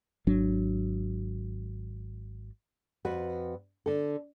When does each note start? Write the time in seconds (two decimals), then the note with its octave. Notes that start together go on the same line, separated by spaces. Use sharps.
0.27 G#1 F#3 D4
3.05 F2 F#4 B4
3.86 D3 A4